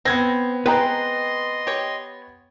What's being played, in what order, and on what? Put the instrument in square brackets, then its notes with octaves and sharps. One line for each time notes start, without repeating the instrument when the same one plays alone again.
[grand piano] B3 G#6 A#6 [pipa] C4
[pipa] G#3 C4 [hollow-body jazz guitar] B4 G5 A#5 [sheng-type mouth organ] D#5 C6
[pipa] G4 C#5